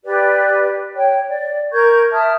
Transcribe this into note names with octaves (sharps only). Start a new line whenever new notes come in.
G4 B4 D5
C#5 G5
D5
A#4 C#6 G6 G#6
E5 A5 D#6 F6